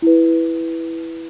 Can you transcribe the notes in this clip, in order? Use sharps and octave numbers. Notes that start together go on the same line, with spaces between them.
E4 B4